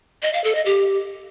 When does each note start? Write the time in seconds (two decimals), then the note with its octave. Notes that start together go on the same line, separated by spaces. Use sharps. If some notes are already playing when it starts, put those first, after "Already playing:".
0.23 D#5
0.33 F5
0.44 A4
0.55 D#5
0.66 G4